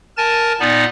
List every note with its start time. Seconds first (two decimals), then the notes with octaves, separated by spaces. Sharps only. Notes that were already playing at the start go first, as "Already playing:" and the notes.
0.17 A#4 G#5 A5 A6
0.60 A#2 B3 D#4 D5